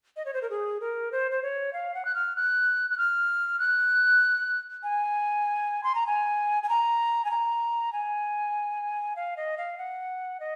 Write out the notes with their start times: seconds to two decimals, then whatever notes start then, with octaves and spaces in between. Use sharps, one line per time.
0.17 D#5
0.26 C#5
0.34 C5
0.42 A#4
0.50 G#4
0.81 A#4
1.12 C5
1.31 C5
1.43 C#5
1.73 F5
1.94 F#5
2.05 F#6
2.15 F6
2.36 F#6
2.90 F#6
2.98 F6
3.59 F#6
4.83 G#5
5.84 C6
5.95 A#5
6.07 G#5
6.63 G#5
6.69 A#5
7.25 G#5
7.31 A#5
7.93 G#5
9.16 F5
9.37 D#5
9.58 F5
9.78 F#5
10.40 D#5